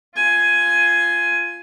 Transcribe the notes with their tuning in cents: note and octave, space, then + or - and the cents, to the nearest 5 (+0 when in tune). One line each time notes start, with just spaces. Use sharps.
F4 -5 G#5 +10